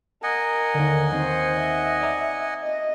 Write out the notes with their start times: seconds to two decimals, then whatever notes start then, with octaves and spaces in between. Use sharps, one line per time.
0.23 A#4 D#5 F#5 G#5
0.74 D#2 D3
1.12 D#3 C4 C5
1.60 E5
2.01 D5 A#5 D#6
2.63 D#5